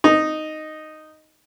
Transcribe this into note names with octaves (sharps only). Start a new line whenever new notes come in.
D#4